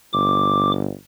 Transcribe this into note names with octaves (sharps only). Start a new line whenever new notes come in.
G1 D6